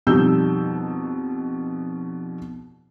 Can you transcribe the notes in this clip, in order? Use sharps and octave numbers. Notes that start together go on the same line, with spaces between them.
F2 B2 G3 D#4 E6 G6